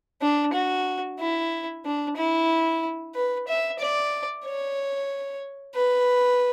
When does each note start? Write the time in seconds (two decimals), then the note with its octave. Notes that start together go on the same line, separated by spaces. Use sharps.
0.22 D4
0.54 F#4
1.20 E4
1.85 D4
2.17 E4
3.15 B4
3.48 E5
3.79 D5
4.45 C#5
5.75 B4